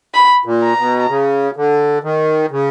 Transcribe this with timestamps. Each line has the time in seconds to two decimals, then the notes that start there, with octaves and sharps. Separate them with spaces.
0.14 B5
0.45 A#2
0.62 A#5
0.78 B2
1.08 C#3
1.56 D3
2.04 D#3
2.51 C#3